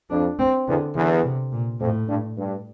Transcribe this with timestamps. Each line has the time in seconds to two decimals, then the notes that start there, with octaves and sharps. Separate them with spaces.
0.10 F2 D4
0.39 C4
0.67 E2 D3
0.95 E2 D3
1.23 C3
1.52 A#2
1.81 F2 A2
2.09 G2
2.38 G2